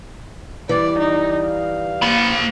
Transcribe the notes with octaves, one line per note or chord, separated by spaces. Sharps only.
E3 G3 D5
D#4
F5
A#3 B5